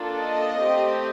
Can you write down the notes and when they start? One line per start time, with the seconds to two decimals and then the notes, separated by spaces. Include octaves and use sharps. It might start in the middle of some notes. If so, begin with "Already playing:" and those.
Already playing: A#3 D4 F4 A4
0.21 D#5
0.60 A3 C4 G4